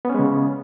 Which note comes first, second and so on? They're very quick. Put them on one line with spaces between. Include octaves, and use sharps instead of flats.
B3 C#4 G#3 C#3